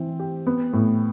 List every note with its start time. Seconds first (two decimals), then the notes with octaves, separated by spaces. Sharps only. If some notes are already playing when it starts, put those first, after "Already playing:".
Already playing: E3 C4
0.20 G4
0.47 B3
0.73 A2